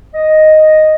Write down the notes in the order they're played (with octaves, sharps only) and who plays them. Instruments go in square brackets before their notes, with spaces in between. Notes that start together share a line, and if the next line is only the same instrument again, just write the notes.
[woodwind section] D#5